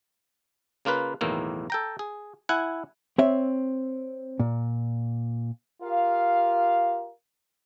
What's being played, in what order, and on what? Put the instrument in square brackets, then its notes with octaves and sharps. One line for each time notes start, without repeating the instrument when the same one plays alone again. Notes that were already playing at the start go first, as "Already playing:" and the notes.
[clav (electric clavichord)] C#3 A#3 F4 B4
B1 E2 A2 D#3 A#3
A4 G5 A#5
G#4
E4 F#5 G#5
[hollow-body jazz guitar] C4 C#5 E5
A#2
[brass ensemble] F4 G4 A#4 F5